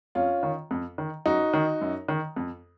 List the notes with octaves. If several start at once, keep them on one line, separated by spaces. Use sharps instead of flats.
F2 C#4 F4
D#3
F2
D#3
F#2 D#4 F#4
D#3
F#2
D#3
F2